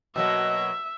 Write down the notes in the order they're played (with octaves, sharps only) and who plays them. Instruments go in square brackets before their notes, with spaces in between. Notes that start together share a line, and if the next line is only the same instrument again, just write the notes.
[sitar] B2 F#3 A#3 [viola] E5